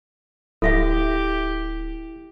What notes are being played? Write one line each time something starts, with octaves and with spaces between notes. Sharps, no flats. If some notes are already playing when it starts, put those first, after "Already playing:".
D1 E4 G4 A4 E5 F5